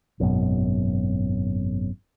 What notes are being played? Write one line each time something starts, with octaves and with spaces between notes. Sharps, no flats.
G#1 F#2 B2